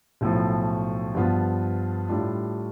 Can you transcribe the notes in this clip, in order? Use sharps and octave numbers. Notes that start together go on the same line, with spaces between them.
B1 A2 F3
G2 F3 B3 F4
A2 G3 D4 F4